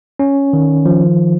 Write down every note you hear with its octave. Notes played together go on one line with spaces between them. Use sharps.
C#4
D#3
F3